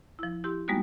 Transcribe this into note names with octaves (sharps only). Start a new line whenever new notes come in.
F3 E4
E4 G4 C6
G3 G#3 A#3 B3 D#4 F#4